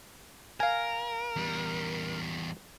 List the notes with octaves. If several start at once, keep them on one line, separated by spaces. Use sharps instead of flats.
A#4 F5 G#5
E2 G3